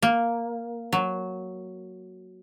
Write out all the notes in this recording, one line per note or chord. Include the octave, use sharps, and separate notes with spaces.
A#3
F#3